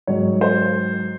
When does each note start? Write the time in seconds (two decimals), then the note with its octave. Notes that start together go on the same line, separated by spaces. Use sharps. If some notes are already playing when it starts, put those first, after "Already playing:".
0.07 G#2 D#3 F#3 C#5
0.41 C5